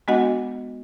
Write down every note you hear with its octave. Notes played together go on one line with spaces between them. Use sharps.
G#3 B3 D4 F#4 D#5 F#5